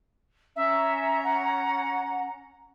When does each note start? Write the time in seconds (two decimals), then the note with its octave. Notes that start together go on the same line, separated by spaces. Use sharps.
0.56 C#4 E5 A#5
1.23 F#5